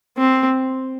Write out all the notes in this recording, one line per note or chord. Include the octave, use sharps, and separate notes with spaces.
C4